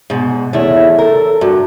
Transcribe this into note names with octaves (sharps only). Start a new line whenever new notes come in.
G#2 B2
E2 A3 E4 C#5
A4 A#4
G2 F#4